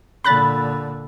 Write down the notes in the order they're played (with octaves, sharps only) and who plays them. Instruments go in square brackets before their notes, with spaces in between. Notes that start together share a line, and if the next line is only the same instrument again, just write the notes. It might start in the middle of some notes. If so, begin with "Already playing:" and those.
[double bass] A#2 D3 [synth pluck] B5 F#6 A6